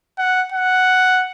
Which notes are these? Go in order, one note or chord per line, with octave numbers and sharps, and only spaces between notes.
F#5
F#5